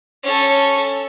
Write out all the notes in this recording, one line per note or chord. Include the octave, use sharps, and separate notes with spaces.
C#4 A4